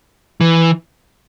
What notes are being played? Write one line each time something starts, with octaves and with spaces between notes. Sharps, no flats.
E3